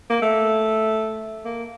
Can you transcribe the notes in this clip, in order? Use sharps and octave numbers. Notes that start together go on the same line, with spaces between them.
A#3
A3
A#3